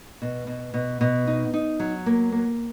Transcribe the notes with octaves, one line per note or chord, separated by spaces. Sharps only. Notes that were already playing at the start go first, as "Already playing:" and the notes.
B2
B2
B2
B2
D#4
D#4
F#3
A#3
A#3